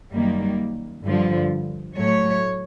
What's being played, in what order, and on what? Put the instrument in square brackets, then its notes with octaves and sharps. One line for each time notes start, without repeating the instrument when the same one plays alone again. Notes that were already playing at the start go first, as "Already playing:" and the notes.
[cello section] F#2 D#3 G3 A#3
G2 D3 F3
A2 F#3 A3 C#5